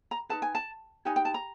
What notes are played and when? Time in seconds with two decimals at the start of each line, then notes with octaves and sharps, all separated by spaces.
0.11 A#5
0.29 D#4 G#4 B4 A5
0.42 G#5
0.55 A5
1.05 D#4 G4 B4 G#5
1.16 G5
1.25 A5
1.34 A#5